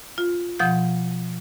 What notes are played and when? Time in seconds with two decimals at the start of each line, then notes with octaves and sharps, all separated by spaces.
0.18 F4
0.59 B2 F3 F#5 G6